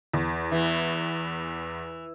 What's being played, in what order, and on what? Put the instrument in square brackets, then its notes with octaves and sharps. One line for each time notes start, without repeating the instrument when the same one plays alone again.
[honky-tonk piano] E2
[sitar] E3